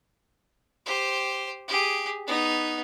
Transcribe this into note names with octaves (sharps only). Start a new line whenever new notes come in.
G4 C5
G4 G#4
B3 D#4